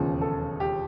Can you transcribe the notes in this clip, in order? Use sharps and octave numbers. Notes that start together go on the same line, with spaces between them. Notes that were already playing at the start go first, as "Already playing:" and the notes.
Already playing: E1 D#2 C#3 F3
A4
G4